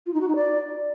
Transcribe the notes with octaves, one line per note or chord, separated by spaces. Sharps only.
F4
D#4
F#4
D#4
D5